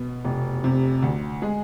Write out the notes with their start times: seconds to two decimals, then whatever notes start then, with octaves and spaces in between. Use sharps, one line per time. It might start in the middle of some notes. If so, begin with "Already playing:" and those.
Already playing: B2 B3
0.25 F1
0.64 C3
1.02 D2
1.42 G#3 G#4